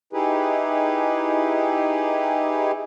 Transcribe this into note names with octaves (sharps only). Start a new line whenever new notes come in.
D#4 E4 G4 G#4 B4